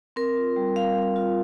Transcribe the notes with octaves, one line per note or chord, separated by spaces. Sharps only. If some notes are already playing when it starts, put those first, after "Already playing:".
C4 A#4
F4
G3
G3 F5
C4
F4